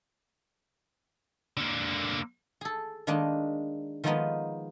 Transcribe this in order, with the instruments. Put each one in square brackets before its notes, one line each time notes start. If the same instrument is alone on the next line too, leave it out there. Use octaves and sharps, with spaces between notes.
[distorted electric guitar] D3 A#3
[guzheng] G#4 A4
D#3 G#3 A#3 D4 D#4
D#3 F3 G#3 A#3 B3 D#4